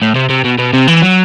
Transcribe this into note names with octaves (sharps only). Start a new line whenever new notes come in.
A2
C3
C3
B2
B2
C3
E3
F#3